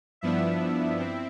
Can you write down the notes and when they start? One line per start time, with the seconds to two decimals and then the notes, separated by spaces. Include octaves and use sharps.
0.21 G2 F3 B3 D4 E4 E5
0.99 C4